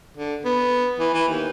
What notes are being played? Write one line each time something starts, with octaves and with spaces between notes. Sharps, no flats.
D3
B3
E3
E3
D#2